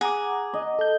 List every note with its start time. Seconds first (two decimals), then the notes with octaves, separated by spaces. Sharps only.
0.01 G#4 F#5 A#5 D6
0.54 D#5
0.79 A4 G6